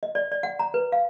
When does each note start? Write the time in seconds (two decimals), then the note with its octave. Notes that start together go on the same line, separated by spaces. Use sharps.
0.03 D#5
0.15 D5
0.32 D5
0.43 F#5
0.59 A#5
0.74 B4
0.92 F5